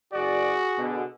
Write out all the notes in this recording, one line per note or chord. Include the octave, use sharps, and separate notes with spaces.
F#1 F#4 G#4 D5
B2 D3